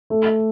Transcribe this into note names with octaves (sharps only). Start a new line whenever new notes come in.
A3